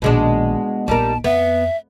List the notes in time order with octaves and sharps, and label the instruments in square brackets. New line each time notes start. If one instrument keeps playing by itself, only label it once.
[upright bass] A#1 D#3 [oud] B2 G#3 D4
[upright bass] A#1 B3 [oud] G3 D#4 A#4 [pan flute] A5
[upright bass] F2 [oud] B3 [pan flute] E5